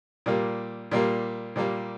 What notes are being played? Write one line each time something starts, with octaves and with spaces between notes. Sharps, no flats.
A#2 G3 A#3
A#2 G3 A#3
A#2 G3 A#3